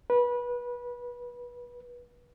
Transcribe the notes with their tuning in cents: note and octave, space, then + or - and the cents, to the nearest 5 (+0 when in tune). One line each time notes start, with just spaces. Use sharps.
B4 -25